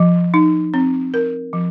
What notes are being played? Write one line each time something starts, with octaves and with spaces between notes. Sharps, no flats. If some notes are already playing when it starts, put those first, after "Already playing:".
Already playing: F3
D#4
C4
A#4
F3